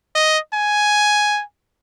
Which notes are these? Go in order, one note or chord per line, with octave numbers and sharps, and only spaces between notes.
D#5
G#5